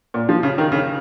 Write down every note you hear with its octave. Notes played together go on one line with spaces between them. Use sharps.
A#2
F3
C#3
D#3
C#3